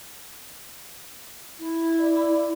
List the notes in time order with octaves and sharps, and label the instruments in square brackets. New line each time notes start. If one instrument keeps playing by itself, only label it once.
[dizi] E4
[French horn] D5